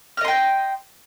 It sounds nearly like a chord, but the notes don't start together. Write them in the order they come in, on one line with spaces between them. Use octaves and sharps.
F6 D#5 C6 G5